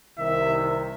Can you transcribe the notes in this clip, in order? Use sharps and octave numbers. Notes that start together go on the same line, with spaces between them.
C2 C3 D#3 E5